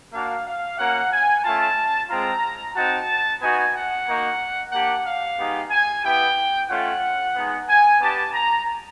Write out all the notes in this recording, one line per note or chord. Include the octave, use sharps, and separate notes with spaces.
A#3 D4 F#4 F5
F5
A#3 C#4 F#4 F#5
G#5
A3 C#4 F4 A5
G#3 C4 F4 A#5
C4 D#4 F#4 A5
B3 D#4 F#4 G#5
F#5
A#3 D#4 F#4
A#3 D4 G4 F#5
F5
G#3 B3 D#4 G4
G#5
B3 E4 G4 G5
A3 C#4 F4 F#5
G#3 B3 D#4
G#5
B3 D4 G4 A5
A#5